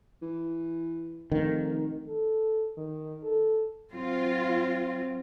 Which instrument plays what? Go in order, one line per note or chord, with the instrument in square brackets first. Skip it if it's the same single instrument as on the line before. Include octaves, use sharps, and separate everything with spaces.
[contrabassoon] E3
[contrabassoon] F1 [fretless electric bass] D#3
[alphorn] A4
D#3
A4
[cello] F#3 C4 [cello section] F4